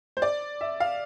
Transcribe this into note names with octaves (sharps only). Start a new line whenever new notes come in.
C5
D5
E5
F5